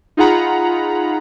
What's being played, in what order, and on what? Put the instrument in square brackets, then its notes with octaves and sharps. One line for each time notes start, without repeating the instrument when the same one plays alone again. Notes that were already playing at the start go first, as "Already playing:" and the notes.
[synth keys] D#4 F4 G#4 F#5 A#5 B5